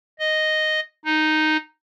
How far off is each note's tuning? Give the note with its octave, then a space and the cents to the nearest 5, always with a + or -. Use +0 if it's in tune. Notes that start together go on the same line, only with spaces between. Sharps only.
D#5 -5
D#4 -5